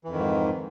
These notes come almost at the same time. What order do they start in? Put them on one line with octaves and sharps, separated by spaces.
E3 F2 D#3 G#2